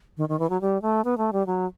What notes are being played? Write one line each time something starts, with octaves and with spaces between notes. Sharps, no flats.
D#3
D#3
E3
F#3
G3
A3
B3
A3
G3
F#3